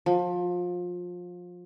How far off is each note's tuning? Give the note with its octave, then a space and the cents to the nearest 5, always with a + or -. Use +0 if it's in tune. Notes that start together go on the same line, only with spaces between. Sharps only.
F3 +25